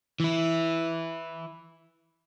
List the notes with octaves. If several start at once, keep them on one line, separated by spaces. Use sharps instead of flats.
E3 E4